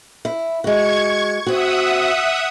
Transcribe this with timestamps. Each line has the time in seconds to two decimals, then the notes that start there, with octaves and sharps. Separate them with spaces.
0.25 E4
0.64 G#3 F#4 C#6 G#6
1.47 C4 F#4 E5 F#5 D#6